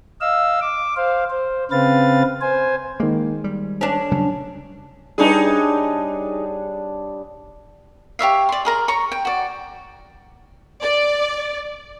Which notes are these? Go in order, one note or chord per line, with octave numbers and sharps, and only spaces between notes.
D#5 F5 E6
D6
C5 F5
C5
C#3 C4 B4 F5 A6
C5 G#5
D#3 G#3 A#3
G3
C#4 D4
C#3 F#3 G3
G3 D4 D#4 G#4 C#5
G4 C#5 E5 F5
D5 C6
G#4 A#4 A#5
C#5 A#5 C#6
G5
F#4 D5
D5